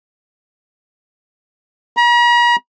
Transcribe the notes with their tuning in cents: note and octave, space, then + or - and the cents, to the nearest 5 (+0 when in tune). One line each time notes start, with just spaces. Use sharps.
A#5 +45